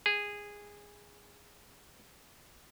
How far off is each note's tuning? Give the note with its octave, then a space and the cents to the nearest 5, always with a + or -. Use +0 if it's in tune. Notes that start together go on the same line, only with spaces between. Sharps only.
G#4 -15